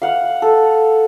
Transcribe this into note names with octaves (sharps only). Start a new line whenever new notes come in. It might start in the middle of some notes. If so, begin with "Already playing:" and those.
F5 F#5
A4